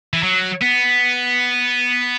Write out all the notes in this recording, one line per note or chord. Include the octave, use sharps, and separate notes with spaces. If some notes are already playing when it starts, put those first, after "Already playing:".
E3
F#3
B3